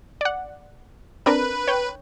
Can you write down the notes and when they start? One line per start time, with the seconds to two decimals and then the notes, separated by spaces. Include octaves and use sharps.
0.21 D5 F#5
1.26 C4 D4 A#4 B4
1.68 C#5 G5